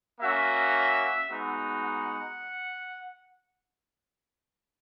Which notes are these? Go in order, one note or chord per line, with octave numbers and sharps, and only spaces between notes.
A#3 C#4 F#4 E5
G#3 B3 D#4 F#4
F#5